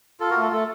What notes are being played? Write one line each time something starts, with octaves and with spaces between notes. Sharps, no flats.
F4 A4
F#4 A#4
A3
A4
A3 A4